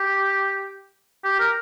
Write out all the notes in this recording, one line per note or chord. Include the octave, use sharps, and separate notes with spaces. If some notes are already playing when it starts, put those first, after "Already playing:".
Already playing: G4
G4
A#4